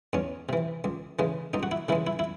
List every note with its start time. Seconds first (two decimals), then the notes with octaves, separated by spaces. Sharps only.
0.13 E2 C#4
0.49 C3 E3
0.84 C#2
1.19 C#3 E3 G#3
1.54 C#2 D#4
1.63 F#4
1.71 E4
1.89 C#3 E3 G#3 E4
2.07 E4
2.19 E4